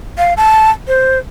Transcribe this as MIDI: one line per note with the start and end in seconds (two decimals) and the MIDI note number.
0.18 0.34 77
0.37 0.71 81
0.88 1.18 72